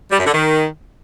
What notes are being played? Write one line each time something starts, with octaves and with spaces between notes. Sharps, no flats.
G3
F#2
D3
D#3